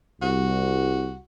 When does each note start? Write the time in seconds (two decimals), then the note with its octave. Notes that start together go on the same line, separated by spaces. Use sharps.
0.22 C2 F#4